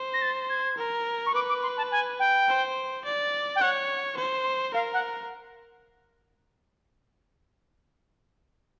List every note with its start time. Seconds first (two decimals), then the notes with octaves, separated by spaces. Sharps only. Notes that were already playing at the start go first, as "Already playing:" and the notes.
Already playing: C5
0.14 A#6
0.22 A6
0.50 G#6
0.78 A#4
1.26 C#6
1.34 B4 D6
1.49 D6
1.63 C6
1.77 A5
1.91 G#5
2.20 G5
2.48 C5
3.04 D5
3.56 G5
3.61 C#5 F#5
4.17 C5
4.74 A#4 F5
4.94 F#5